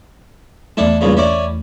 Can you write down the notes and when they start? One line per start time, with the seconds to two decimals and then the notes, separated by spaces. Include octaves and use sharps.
0.77 E2 A3 D4 E4 A4
1.01 G2 A#2 C#3
1.17 C#4 E4 D5